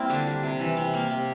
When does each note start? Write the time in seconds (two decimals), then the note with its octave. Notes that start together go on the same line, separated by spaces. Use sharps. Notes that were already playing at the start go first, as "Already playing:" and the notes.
Already playing: G3 A#3 C4 E4
0.10 D3 D4
0.27 G3
0.43 C3
0.60 E3
0.77 C3
0.94 A#3
1.10 C3